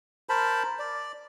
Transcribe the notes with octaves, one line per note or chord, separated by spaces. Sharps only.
A#4 C5 A5 B5
D5